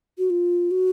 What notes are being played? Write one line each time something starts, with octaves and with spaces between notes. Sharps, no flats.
F#4
F4
F#4